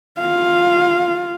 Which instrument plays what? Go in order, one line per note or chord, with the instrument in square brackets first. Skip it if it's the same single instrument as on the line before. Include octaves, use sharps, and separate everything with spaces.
[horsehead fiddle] F4 F5